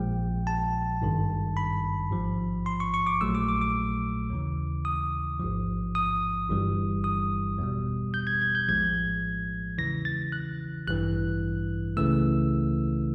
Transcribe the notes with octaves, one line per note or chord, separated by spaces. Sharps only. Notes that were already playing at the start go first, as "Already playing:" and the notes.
Already playing: A#1 A#2 F3 G#3 G5
A5
G#1 G2 D#3
B5
A1 G#2 F3
C6
C#6
C#6
D6
A#1 A#2 F#3 A3 E6
D6
D6
D6
D#2 C#3 E3
D#6
A1 G#2 F3
D#6
G1 G2 E3 G3
D#6
E2 B2 G3
G6
G#6
G#6
G6
A#1 A2 F3 G#3 G#6
E2 C#3 E3 A#6
A6
F#6
A1 G2 E3 F#6
C#2 C#3 E3 A3 E6